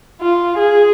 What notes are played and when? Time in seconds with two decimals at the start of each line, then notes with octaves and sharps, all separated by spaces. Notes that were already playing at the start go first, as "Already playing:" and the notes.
0.22 F4
0.59 G#4